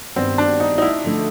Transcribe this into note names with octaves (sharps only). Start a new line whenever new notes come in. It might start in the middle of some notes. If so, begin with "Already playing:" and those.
G2 D#3 G3 B3 C4
D4
D#4
D#4
E4
D3 F3 A3 D4